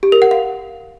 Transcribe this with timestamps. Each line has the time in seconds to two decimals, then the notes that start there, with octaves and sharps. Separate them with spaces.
0.03 G4
0.12 A#4
0.22 F#5
0.31 F5